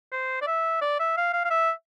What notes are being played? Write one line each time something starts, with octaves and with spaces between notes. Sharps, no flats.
C5
D5
E5
D5
E5
F5
F5
F5
E5